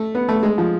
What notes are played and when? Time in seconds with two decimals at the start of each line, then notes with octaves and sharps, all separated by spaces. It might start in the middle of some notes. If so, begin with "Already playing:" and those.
Already playing: A3
0.15 B3
0.29 A3
0.43 G#3
0.58 F3